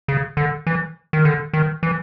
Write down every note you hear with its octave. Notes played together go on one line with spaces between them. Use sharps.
C#3
D3
E3
D#3
D3
D#3
E3